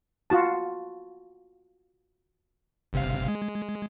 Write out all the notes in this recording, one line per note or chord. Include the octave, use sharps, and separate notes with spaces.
F4 F#4 A5
G1 C3 F5
G#3